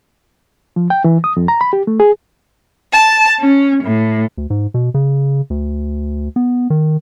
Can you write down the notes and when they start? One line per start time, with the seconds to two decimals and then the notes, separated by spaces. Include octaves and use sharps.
0.76 F3
0.90 G5
1.04 E3
1.24 D#6
1.37 F2
1.48 A#5
1.61 B5
1.73 G4
1.87 A3
2.00 G#4
2.92 A5
3.40 C#4
3.83 A2
4.37 D2
4.50 G#2
4.74 B2
4.94 C#3
5.50 D2
6.36 B3
6.70 D#3